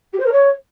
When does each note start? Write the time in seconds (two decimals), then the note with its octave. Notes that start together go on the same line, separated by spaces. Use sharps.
0.13 G4
0.19 C5
0.25 A#4
0.32 C#5